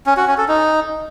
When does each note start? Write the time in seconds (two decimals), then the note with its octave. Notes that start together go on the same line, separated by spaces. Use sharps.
0.06 C#4
0.17 F#4
0.27 C#4
0.38 A4
0.48 D#4